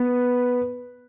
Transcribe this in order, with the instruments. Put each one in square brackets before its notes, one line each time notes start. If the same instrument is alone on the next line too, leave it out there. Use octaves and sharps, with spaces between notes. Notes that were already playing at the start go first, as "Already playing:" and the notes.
Already playing: [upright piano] B3 B4